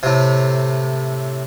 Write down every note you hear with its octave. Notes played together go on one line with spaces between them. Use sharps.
A2 C3